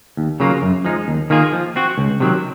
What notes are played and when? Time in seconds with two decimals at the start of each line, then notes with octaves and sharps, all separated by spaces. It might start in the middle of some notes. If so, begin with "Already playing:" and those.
0.17 D#2
0.40 C#3 F#3 A#3 F4
0.62 F#2
0.84 F3 G#3 D#4
1.08 D#2
1.30 D#3 A#3 F4 G#4
1.53 F3
1.76 C4 F#4
1.98 C#2
2.20 C3 D#3 F#3 C4